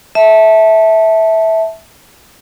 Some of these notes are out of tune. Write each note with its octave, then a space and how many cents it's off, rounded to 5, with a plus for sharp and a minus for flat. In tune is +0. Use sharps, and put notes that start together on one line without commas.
E5 -15 A5 -5